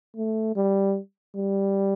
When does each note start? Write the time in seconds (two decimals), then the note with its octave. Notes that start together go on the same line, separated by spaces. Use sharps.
0.17 A3
0.56 G3
1.35 G3